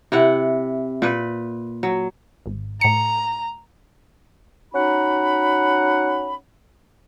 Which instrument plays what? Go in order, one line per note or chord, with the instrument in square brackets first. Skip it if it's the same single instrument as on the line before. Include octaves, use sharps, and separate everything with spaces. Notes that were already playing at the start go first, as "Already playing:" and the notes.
[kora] C3 E4 F#5
A#2 B4
F#3
[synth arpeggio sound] G#1
[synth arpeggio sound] A2 C#7 [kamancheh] A#5
[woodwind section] C#4 D#4 F#4 F#5 B5